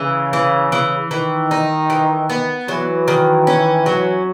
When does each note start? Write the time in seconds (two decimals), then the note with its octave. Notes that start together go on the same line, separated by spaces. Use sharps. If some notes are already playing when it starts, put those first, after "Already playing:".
Already playing: C#3 E3
0.33 E3
0.72 E3
1.11 D#3 E3
1.51 D#4
1.90 E3
2.30 B3
2.68 E3 F#3
3.08 D#3
3.47 C#4
3.86 F#3